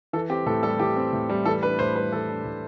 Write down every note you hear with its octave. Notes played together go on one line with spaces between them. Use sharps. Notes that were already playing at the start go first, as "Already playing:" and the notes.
E3 A4
C4 G4
A2 A4
G3 A4
E3 G4
C4
A2
G3
E3 A4
D4 B4
A2 C5
G3 B4
E3 A4
D4
A2